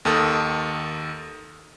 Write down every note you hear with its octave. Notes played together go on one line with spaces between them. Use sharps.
D#2 D#3 A4 D#6